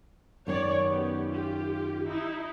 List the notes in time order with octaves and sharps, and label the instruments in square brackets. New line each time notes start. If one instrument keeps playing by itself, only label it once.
[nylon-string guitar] F#2 D#3 C#4 [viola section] C#5 D5
[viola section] B3 G4
F4 G4
D#4 E4